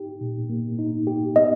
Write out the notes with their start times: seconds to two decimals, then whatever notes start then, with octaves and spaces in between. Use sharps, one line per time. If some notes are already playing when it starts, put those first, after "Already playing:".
Already playing: D#4 G4
0.21 A#2
0.49 A#3
0.79 D#4
1.07 G4
1.36 B3 D#5